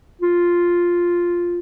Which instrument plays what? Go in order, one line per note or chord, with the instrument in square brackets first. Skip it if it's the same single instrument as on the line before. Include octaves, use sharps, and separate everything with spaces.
[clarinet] F4